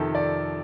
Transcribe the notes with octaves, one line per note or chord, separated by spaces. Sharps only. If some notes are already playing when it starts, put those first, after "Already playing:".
Already playing: F2 C3 D#3 A4
D5